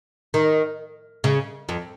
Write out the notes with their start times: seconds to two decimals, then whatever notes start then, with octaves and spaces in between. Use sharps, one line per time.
0.34 D#3
1.24 C#3
1.69 F2